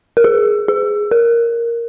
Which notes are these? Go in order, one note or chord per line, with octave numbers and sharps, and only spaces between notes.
A#4
G#4
G#4
A#4